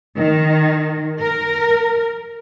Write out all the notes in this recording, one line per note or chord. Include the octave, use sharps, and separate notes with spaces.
D#3
A#4